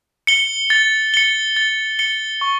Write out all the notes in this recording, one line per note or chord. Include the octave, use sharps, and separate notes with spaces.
C#7 G7
A6
C#7 G7
A6
C#7 G7
C#6